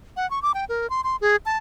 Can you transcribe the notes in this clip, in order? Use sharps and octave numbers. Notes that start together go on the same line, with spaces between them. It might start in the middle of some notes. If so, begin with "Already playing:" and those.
F#5
C#6
D6
G5
A#4
C6
C6
G#4
A5